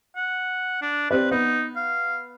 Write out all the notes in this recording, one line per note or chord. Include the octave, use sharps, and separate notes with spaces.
F#5
D4
C4 G4 B4 D5
B3 D#4
F5